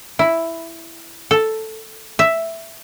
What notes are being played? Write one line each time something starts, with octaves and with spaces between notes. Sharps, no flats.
E4
A4
E5